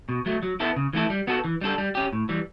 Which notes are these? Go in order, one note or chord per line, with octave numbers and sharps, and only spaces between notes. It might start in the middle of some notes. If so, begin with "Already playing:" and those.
B2
F#3 A3
F#3
B3 E4 A4
C#3
E3 A3 E4 A4
G3
B3 F#4 A4
E3
G3 D4 A4
G3
C#4 G4
A2
E3 G3